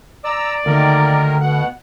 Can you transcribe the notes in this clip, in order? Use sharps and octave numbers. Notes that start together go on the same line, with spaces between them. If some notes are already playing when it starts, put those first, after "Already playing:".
D5 A#5 E6
D2 D#3 A#3 A#4
B2 F#5